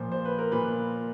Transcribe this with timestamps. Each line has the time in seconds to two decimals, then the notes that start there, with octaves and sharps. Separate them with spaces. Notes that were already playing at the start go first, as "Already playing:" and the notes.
Already playing: A#2 F3 C5
0.12 C5
0.25 B4
0.39 A#4
0.52 A#2 B4